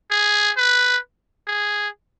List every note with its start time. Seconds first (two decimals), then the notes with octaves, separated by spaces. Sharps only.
0.11 G#4
0.57 B4
1.48 G#4